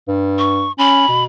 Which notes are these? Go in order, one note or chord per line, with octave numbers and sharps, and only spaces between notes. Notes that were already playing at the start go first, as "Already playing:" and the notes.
G2
C#6
C#4 B5
B2